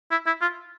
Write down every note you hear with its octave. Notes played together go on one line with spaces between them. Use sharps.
E4
E4
F4